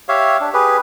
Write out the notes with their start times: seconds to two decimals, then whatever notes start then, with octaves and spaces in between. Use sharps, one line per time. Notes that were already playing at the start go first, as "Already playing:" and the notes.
0.09 G4 C#5 E5 F5
0.41 D4
0.54 G4 G#4 B4